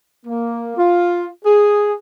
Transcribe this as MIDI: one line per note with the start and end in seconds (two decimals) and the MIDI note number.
0.25 0.75 58
0.77 1.26 65
1.45 1.92 68